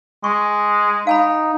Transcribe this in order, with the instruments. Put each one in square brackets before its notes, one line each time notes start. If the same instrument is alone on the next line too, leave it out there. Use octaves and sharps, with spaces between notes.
[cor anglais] G#3 [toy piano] C#6
[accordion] D#4 [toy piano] F5 G#5 B5